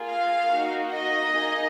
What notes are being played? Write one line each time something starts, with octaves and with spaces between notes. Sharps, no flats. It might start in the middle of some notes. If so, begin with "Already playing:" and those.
Already playing: A#3 F4 G#4
F5
A#3 D#4 F#4
D#5
A#3 D#4 G#4